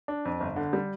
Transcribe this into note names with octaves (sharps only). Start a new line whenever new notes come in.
D4
F2
G1
D3
G3